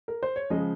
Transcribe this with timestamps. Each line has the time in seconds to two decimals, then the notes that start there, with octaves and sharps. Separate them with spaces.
0.08 A#4
0.23 C5
0.36 C#5
0.50 C#3 F3 G#3 D#5